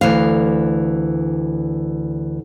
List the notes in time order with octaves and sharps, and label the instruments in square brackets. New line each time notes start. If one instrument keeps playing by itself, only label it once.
[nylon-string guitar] D2 E3 F5